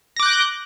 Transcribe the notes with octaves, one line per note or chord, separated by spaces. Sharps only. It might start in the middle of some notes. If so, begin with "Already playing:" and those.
D6 F#6 G6 A#6